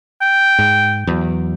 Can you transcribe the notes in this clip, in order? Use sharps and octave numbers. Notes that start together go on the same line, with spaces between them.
G5
G#2
E2 F#3